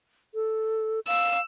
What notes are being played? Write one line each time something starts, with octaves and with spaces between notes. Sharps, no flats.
A4
F5 E6